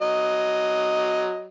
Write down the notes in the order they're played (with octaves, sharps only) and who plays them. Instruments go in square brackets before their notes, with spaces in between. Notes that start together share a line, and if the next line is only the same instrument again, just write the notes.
[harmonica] F#3 D#5